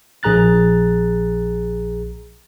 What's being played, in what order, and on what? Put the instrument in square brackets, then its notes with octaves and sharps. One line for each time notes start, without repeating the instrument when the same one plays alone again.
[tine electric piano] A#1 G#4 A#5 F#6 A6